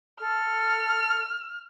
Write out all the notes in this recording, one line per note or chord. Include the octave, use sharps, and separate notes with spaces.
A4 F6